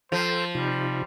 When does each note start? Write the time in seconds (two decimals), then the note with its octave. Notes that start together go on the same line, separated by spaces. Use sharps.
0.12 F3 A4 C5 G5 A#5
0.55 C3 G3 D#4 F4